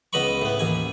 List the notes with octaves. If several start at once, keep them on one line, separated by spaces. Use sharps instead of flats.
C#2 B3 D#5 B5 C#6
A2 B3
A1 D#2 G#5